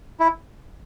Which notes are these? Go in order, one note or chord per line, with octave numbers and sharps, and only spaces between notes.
E4